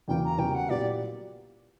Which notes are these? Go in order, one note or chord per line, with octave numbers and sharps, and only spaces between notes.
E2 C#3 F#3 A#3 G5
A#5
C#3 G3 B3 F#4 A#4 G5
F#5
A#2 F#3 B3 E4 G4 D5